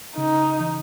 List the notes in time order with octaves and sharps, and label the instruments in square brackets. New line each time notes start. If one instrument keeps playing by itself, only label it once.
[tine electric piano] C#3 [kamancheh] D#4
[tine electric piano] E3